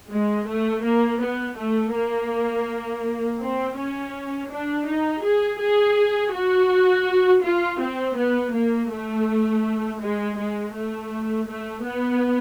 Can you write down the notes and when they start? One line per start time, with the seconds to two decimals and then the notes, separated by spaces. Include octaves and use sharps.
0.10 G#3
0.47 A3
0.83 A#3
1.20 B3
1.57 A3
1.93 A#3
3.40 C4
3.77 C#4
4.50 D4
4.88 D#4
5.23 G#4
5.61 G#4
6.33 F#4
7.44 F4
7.81 C4
8.17 B3
8.54 A#3
8.92 A3
10.02 G#3
10.38 G#3
10.74 A3
11.48 A3
11.85 B3